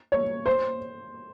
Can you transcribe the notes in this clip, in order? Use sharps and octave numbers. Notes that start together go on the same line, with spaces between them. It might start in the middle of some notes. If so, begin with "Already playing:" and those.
C#5
C5